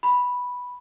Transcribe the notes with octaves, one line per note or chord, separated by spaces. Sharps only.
B5